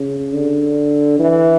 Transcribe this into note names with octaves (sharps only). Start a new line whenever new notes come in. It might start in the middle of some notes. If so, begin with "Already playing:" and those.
Already playing: C#3
D3
E3